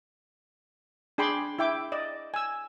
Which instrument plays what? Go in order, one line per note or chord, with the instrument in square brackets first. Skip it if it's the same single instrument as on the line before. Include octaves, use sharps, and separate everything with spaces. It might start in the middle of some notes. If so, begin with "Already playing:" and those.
[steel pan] D4 G#4 G5 B5 C6 D6
E4 E5 G5 D6
D5 D#5
G#5 E6